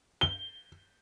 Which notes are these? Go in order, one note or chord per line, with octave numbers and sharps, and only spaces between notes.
G7